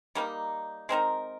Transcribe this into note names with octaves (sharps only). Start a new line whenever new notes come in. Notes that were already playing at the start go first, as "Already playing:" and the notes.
G3 A#3 D#4
G#3 C4 D#4 A#4